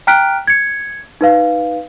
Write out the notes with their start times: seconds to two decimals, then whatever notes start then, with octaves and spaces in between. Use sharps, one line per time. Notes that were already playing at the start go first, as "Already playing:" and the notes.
0.07 G5 A#5 F6 F#6 B6 D7
0.47 G#6 C#7
1.21 D#4 B4 F5